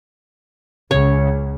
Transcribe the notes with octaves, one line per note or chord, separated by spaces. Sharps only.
C#2 C#3 C#5